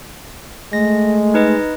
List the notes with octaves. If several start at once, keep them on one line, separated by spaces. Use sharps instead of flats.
G#3 A3 A#6
D#4 B4 D#5